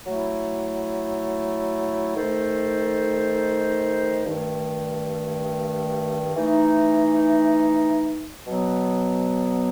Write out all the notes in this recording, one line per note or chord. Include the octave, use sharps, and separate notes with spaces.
F#3 A3 E4
D#3 A3 D#4 A4 C5
G2 D#3 A3
E3 A3 D#4
B2 F#3 B3